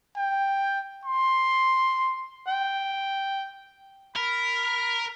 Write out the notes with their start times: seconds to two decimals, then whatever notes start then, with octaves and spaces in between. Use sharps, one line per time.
0.16 G5
1.05 C6
2.48 G5
4.16 A#4 B5